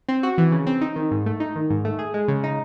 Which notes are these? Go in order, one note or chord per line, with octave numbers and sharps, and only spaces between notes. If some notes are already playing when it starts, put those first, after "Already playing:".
C4
F#4
E3
C#3
C4
D#4
D#3
G#2
A3
D#4
D#3
G#2
A3
G#4
G#3
C#3
D#4